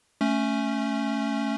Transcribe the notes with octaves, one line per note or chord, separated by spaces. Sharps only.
A3 C#4